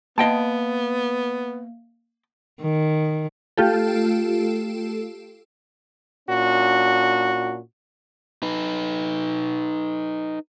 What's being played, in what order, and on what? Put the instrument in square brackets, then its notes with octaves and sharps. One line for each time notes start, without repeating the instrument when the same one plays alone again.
[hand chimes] A#3 F5 [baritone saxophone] B3 [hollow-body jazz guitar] D#5 G5 A5
[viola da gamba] D#3
[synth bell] A3 F4 G4 A4
[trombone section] A#2 C#4 D4 F#4
[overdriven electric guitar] D#4 B4